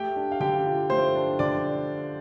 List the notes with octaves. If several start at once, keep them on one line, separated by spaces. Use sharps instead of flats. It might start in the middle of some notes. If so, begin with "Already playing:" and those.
Already playing: A3 G4 G5
D4
F5
D3 G4 G5
F4
A3 C5 C6
D4
D3 D5 D6